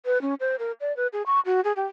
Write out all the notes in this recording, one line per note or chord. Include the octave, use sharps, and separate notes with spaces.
B4
C#4
C5
A#4
D5
B4
G#4
C#6
F#4
G#4
G4